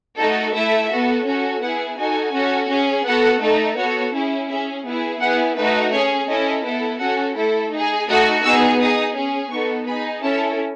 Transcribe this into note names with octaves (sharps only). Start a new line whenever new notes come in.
A3 D#4 F#4 A4
A3 E4 A4 E5
B3 F#4 A4
C#4 F#4 A4
B3 E4 G#4 F#5
D#4 F#4 A4 G#5
C#4 F#4 A4
C#4 G#4
B3 F#4 A4 F#5
A3 D#4 A4
B3 F#4 A4 C#5
C#4 E4 G#4
C#4 G#4 E5
B3 E4 G#4
B3 E4 G#4 F#5
A3 D#4 F#4 B4
C#4 G#4 C#5
C#4 E4 A4 D#5
B3 E4 A4
C#4 F#4 A4 F#5
A3 E4 A4
D#4 G#4
A3 D#4 F#4 A4 D#6
B3 D#4 G#4 E6
D#4 G#4 D#6
C#4 G#4
B3 D#4 A4 C#6
D#4 G#4 B5
C#4 E4 A4 A5